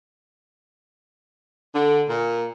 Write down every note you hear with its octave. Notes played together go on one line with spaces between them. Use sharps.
D3
A#2